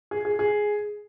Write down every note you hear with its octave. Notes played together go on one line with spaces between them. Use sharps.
G#4
G#4
G#4